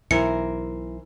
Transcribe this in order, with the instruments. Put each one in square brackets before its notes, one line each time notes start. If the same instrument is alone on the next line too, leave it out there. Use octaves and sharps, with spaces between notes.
[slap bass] B1 [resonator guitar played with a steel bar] E3 A#4 C5 [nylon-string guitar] E4 [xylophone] C#7